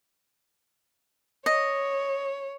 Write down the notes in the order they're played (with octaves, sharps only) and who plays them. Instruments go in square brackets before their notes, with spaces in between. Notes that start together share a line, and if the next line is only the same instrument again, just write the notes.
[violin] C#5 [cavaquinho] D#5